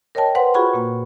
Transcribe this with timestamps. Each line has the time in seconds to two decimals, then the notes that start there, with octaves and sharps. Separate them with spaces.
0.15 A#4 C#5 D#5 G5 A5
0.35 B4 C5 F#5 C6
0.54 F4 F#4 G#4 F#5 B5 C#6
0.74 A#2 A#3